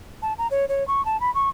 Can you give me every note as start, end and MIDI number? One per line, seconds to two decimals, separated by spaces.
0.22 0.33 81
0.38 0.47 82
0.51 0.65 73
0.69 0.86 73
0.88 1.04 85
1.05 1.19 81
1.20 1.33 83
1.35 1.49 85